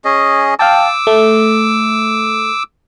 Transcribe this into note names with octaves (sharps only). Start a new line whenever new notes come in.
C#4 G#4 D#5
F5 G5 A5 D6 E6
A3